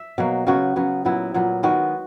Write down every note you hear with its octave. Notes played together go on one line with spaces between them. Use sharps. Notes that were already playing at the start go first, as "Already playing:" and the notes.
Already playing: E5
B2 F#3 A#3
C#3 F#3 B3 F#4
C#3 F#3 B3
A#2 F#3 B3 E4
A#2 F#3 B3
D#3 G#3 B3 F#4